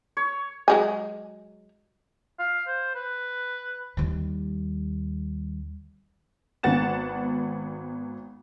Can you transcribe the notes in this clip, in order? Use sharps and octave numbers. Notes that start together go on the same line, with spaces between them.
C#5
F#3 G#3 G#5
F5
C5
B4
D#2 G3
G#1 B3 B4 F#5 A6 E7